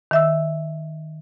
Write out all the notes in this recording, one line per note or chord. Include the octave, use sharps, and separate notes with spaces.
D#3 E5 E6